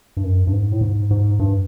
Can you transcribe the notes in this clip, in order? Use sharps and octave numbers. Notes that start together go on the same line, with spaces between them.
G2
F#2
G2
G#2
A2
G#2
G#2
G2